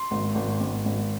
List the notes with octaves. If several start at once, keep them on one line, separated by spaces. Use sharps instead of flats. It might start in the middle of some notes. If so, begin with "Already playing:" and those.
Already playing: C6
G#1
G#1
G#1
G#1